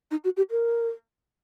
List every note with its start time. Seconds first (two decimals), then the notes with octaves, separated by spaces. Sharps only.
0.11 D#4
0.24 F#4
0.37 G4
0.51 A#4